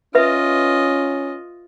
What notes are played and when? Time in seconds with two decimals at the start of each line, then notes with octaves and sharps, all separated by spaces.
0.15 C#4 F4 B4 D#5 E5